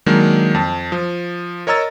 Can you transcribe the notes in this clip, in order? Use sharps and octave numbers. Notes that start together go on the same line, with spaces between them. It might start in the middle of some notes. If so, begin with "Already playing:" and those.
D#3 F#3 G#3 A#3 D4
F2 A5
F3
A#4 C#5 D#5 A#5 E6 A6